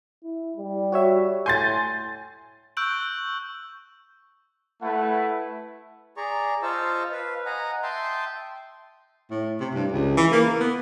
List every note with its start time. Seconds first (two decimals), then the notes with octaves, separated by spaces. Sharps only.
0.24 E4
0.57 G3
0.92 F#4 C#5 E5
1.46 A2 G#5 C6 G6 A6
2.77 C#6 E6 F#6 G6 D7 F#7
4.82 A3 E4 B4 F#5
6.17 G#4 D5 A#5 C#6
6.63 F4 C5 D#5 A5 C#6 E6
7.12 B4 F5
7.46 D#5 F#5 G#5 A#5
7.83 E5 G5 A5 C6 D#6
9.31 A2
9.60 C3
9.74 G2
9.92 C#2
10.17 E3
10.32 A#3
10.60 B3